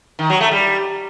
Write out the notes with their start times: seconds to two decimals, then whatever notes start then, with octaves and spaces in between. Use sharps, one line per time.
0.19 D#3
0.30 F#3
0.41 A3
0.51 G3